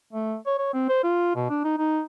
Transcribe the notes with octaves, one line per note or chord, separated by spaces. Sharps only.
A3
C#5
C#5
C4
C5
F4
B2
D4
D#4
D#4